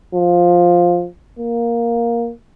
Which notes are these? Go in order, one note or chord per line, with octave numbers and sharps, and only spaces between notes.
F3
A#3